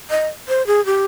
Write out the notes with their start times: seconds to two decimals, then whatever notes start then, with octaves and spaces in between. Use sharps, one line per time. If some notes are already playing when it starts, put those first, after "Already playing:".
0.10 D#5
0.48 C5
0.67 G#4
0.86 G4